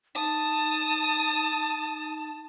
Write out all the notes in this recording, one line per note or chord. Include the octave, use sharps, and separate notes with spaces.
D#4 A5 D#6